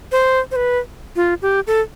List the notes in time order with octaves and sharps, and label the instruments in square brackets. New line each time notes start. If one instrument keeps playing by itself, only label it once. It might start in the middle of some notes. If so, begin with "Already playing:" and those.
[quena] C5
C5
B4
F4
G4
A4